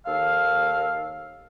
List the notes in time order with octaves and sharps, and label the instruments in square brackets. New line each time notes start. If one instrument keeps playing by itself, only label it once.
[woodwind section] D#2 A4 F5